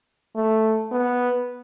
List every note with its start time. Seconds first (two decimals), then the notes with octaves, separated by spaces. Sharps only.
0.36 A3
0.92 B3